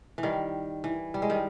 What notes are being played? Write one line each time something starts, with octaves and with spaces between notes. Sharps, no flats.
E3
D#3 G3
E3
G3
G#3
D#3 G3